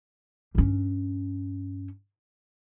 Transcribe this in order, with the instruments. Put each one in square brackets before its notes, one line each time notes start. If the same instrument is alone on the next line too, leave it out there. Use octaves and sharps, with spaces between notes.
[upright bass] G2 C#4